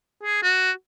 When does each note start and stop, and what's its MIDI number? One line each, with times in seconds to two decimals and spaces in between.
0.23 0.43 68
0.43 0.71 66